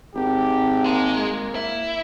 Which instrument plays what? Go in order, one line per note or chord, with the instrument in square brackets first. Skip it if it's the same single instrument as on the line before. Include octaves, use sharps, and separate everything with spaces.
[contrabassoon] G#1 [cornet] G4
[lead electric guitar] G#3 [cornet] A#3
[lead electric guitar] E4